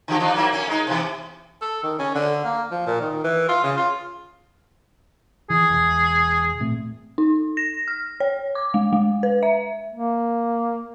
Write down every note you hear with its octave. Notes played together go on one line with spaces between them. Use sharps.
D3 F3 G4
F3 D4 D#4
F#3 A#3 E4
A#3 C#4
G#3 D#4
B2 E3
A4
D#3
C#4
D3
A#3
F3
A#2
D#3
E3
F4
C#3
F4
E3 G#4
E1 E2
A#2 A3 C4
D#4
A#6
F6
C#5
D6
G#3
G#3
B4
E5
A#3